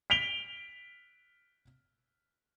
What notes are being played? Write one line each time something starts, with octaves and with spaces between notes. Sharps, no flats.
B6 D7 F7 G7